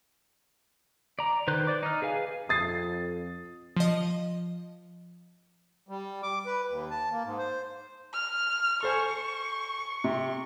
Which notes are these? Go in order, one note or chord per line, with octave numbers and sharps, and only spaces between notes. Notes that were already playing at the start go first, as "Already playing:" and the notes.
D5 A#5
D#3 B4 C5 F#6
C5 D5 D6
D#4 F6
G#4 B4 F5 G#5
F2 D#6 A6 C7
F3 D#5
G3
D6
B4
D#2
A5
A#3
G#2
C5
F6
A4 C5 G#5 C#6
C3